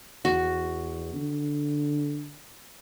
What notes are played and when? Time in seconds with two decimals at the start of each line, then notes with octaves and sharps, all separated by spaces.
0.25 E2 F#4
1.14 D3